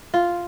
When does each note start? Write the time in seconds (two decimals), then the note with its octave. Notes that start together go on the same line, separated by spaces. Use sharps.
0.14 F4